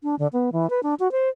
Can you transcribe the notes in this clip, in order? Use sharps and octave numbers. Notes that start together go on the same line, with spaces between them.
D4
D3
B3
E3
B4
D4
F#4
C5